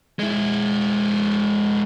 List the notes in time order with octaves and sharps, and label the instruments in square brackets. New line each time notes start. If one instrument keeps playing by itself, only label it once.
[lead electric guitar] G#3 E4